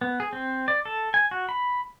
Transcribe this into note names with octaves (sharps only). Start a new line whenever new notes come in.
B3
G#4
C4
D5
A4
G#5
F#4
B5